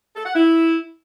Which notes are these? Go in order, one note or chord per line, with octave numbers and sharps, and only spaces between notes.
A4
F#5
E4